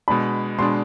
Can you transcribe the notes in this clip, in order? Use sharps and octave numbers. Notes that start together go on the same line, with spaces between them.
B2 G#3 D4 B5
B2 G#3 D4 C6